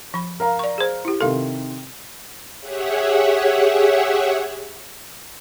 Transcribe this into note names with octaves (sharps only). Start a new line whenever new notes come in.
F3 B5
A#4 F5 A#5
D5 C#6
G#4 C5
E4 G4
C3 D#3 A4 F5 C6
G4 G#4 C#5 E5 F#5